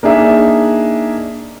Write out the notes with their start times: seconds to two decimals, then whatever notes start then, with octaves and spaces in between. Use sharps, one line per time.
0.03 A#3 D4 D#4 G#4 E5